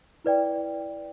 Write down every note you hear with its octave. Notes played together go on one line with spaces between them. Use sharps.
E4 B4 D5 G5